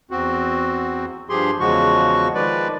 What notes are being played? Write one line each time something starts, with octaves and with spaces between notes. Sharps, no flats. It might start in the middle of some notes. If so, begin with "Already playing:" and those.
E2 C4 F#4
G2 F3 G4 G#4 C6
E2 C#3 F3 G#3 F#4 C#6
D#3 F3 G#3 B4 D5